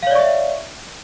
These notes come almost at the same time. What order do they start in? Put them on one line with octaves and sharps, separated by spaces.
F5 C#5 D5 C#6 E5